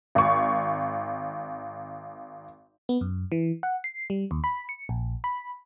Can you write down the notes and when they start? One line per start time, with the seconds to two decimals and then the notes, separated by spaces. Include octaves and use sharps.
0.15 G#1 C#6
2.89 B3
3.01 F#2
3.32 E3
3.63 F#5
3.84 C7
4.10 G3
4.31 D#2
4.44 B5
4.69 C#7
4.89 A#1
5.24 B5